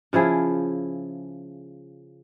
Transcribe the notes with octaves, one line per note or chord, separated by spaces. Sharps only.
C#3 F3 E4 G#4